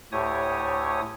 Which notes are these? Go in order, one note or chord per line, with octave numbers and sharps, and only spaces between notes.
D2 A2 G4 C#5 G#5 D#6